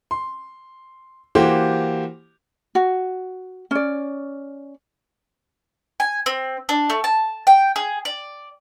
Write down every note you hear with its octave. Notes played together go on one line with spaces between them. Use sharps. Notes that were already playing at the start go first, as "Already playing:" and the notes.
C6
E3 A#3 F#4 G4 C5
F#4
C#4 D5
G#5
C4
D4
A3
A5
G5
G#4
D5